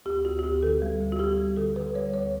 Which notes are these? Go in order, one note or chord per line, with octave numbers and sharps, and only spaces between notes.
D2 G4
D2 F#4
F#4
D2 G4
D3 A4
G3
D2
F#4
G3 G4
G3
D3 A4
D3 B4
G3 C#5
D2 C#5